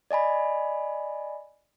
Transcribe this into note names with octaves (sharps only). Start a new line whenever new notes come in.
D5 D#5 G#5 B5